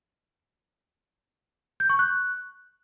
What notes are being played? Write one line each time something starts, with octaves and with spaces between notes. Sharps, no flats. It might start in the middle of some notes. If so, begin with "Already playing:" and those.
G6
C#6
F#6